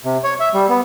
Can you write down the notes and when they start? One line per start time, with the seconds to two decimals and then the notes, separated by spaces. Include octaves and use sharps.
0.05 C3
0.24 C#5
0.40 E5
0.54 G3
0.69 B3